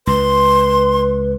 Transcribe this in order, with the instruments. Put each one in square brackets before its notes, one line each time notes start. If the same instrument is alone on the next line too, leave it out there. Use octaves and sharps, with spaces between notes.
[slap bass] C#2 [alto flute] B4 [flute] C6